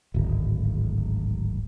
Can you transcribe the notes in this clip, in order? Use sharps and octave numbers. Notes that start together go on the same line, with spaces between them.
D1 G#1